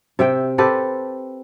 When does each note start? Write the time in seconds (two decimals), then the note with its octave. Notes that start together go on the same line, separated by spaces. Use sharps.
0.19 C3 E5 G5
0.58 C4 G4 A4 B4